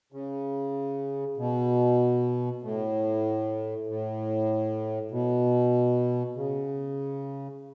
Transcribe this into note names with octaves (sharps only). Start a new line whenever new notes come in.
C#3
B2
A2
A2
B2
C#3